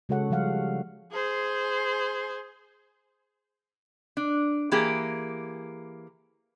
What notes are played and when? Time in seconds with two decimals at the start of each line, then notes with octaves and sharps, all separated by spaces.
0.09 C#3 G#3 F#4 A4 C#5 F#5
0.30 C#3 F3 G3 F5 F#5
1.12 G#4 C5
4.17 D4
4.71 E3 A#3 G4 G#4